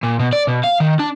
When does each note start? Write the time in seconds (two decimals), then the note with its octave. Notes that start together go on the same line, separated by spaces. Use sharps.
0.03 A#2
0.19 B2
0.33 D5
0.47 B2
0.64 F5
0.80 D#3
0.99 D4